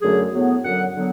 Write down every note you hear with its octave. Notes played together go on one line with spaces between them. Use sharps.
F#2 D3 F#3 A3 G#4
A2 F#3 B3
F#2 D3 F#3 F#5
D3 F#3 B3